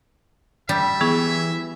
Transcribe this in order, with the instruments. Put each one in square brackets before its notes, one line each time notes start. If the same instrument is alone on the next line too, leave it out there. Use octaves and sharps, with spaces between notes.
[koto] G3 [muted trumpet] E5
[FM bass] E3 [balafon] B3 G#4 C#6